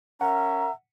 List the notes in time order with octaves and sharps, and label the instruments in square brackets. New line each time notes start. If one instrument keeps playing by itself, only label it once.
[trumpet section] C#4 A#4 E5 [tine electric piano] F#5 [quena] A#5